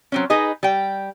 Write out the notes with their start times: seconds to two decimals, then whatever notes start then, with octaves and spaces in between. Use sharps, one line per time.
0.12 F#3 C4 C#4
0.30 D#4 G#4 B4 D#5
0.63 G3 G5